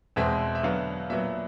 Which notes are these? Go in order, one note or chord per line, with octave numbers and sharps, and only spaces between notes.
E2 B2 G#3 C4 E5
E5
D3 F#3 B3 F5
A#2 F#3 B3 E5